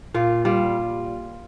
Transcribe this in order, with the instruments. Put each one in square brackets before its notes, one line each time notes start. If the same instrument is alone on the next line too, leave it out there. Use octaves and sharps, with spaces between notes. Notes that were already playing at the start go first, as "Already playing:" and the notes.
[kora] A#2 F4
G3 F4